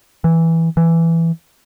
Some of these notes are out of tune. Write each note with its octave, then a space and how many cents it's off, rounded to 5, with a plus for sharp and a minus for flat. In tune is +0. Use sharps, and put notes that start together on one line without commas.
E3 -5
E3 +10